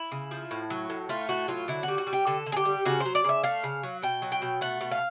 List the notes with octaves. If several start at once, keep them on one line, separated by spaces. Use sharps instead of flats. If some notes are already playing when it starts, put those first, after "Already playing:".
Already playing: E4
C#3
F3
A2
F#3
A2
A3 F4
A2 F#4
F#3 F4
D3 E4
F#4
G3
F#4
G3
G4
D3 A4
D3
G#4
G4
G3
C#3 F#4
C5
F#3
D5
C#3 E5
A3 F5
C#3
F#3
B2 G5
F#3
G5
B2
A3 F#5
B2
F5